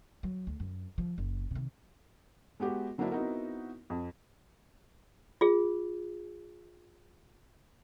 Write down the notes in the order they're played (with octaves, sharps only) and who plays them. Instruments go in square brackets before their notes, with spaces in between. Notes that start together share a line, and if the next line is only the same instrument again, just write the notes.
[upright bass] F#3
D2
F#2
F3
F#1
C3 D#3
[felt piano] G#3 B3 F#4 G4
D3 F#3 A#3 C4 D4 E4
B3 C4 D#4 E4 F#4 A#4
F2
[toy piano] F4 G#4